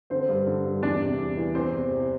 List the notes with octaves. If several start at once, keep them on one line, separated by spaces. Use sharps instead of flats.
D3 C4 C5
G2
D3
G2
E2 D4 D5
C3
E2
E3
E2 C4 C5
C3
C3